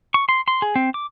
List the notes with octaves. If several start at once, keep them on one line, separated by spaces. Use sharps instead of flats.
C#6
C6
C6
G#4
C4
D6